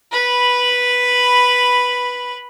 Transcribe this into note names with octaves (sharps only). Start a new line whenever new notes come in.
B4 B5